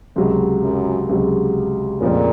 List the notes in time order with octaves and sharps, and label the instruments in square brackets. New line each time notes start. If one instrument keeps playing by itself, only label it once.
[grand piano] C#2 C3 F#3 [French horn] F#2
[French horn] F#2
[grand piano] C#2 C3 F#3
[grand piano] F2 C#3 F3 A3 C#4 [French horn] A#2